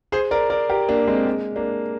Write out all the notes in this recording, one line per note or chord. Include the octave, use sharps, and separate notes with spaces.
G#4 C5
A#4 D5
A#4 D5
G4 A#4
A#3 D4
G#3 C4
G#3
A#3 D4